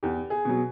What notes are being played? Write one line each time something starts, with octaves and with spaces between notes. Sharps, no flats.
E2 G4
G#4
B2 F#3